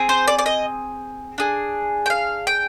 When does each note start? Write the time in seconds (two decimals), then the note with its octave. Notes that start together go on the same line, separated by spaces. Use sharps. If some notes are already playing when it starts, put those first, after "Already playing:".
Already playing: C4 G#4
0.09 C5
0.28 D5
0.38 D5
0.46 D#5
1.38 D4 G#4
2.06 G5
2.10 F5
2.47 G5